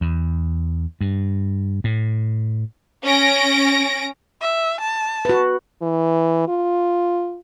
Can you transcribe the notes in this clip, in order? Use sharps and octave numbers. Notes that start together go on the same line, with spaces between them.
E2
G2
A2
C#4 A#6 D7
E5
A5
F#4 B4
E3
F4